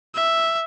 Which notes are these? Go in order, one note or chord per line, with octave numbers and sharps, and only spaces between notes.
E5